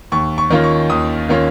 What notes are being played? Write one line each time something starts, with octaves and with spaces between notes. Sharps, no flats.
D#2 C#6
C#6
D#3 A#3 C#4 F4
C#6
D#2 D#6
D#3 A#3 C#4 F4